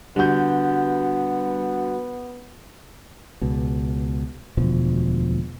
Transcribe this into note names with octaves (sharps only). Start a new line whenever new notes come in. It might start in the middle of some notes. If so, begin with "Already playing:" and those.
D3 G3 B3 F#4 G6
C#2 B2
E1 D2 B2 F3